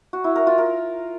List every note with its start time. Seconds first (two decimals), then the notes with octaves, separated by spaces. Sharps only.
0.13 F#4
0.24 E4
0.36 A#4
0.47 F4
0.58 A#4